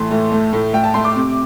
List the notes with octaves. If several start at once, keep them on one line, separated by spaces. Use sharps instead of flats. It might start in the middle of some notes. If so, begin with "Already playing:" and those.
Already playing: A2 E3 A3 A5 C6
A2
A3
A2
A2 G5
A5
A3 C6
D6
C3